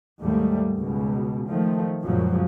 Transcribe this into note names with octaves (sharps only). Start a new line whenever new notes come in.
D#2 G#2 G3 A3
C#2 B2
D#3 F3 A3
C#2 F#2 A#2 C#3 F3 F#3